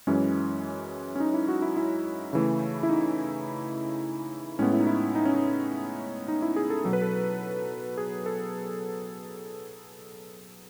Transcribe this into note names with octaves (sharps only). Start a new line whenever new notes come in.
F#2 E3 G#3 C#4
C#4
D#4
E4
F#4
E4
E4
C#3 E3 A3
E4
D#4
A2 G#3 B3 C#4
E4
D#4
E4
D#4
C#4
D#4
D#4
E4
G#4
A4
B2 F#3 B3 A4
B4
A4
G#4
A4